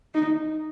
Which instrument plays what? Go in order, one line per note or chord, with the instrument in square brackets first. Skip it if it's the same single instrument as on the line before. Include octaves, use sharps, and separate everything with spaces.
[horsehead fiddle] D#4